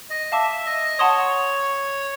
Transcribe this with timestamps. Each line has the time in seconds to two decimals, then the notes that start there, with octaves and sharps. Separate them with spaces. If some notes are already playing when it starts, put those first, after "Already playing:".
0.10 D#5
0.32 E5 F5 A5 D6
0.66 D#5
0.99 C#5 F#5 A5 C6 D#6